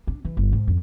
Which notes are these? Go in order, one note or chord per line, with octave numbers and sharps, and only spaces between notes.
D4
E3
G1
G#2
F2